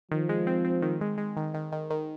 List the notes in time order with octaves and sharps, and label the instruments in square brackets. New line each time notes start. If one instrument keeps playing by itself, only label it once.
[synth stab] D#3 [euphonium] F3
[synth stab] G#3
C4
C4
D#3
G#3
G#3
D#3
D#3
D#3
D#3